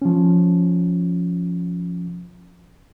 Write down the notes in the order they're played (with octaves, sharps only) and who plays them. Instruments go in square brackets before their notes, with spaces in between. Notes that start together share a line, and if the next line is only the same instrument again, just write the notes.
[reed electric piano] F3 C#4